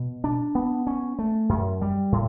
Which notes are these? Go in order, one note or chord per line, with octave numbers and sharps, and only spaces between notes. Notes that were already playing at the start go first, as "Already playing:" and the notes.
Already playing: B2
D4
B3
C#4
A3
F#2
G3
A2